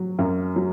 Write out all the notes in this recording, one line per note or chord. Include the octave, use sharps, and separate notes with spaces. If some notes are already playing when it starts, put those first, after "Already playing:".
Already playing: F#3
F#2
F#3